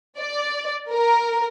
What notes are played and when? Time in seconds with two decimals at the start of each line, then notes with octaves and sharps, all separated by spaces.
0.19 D5
0.92 A#4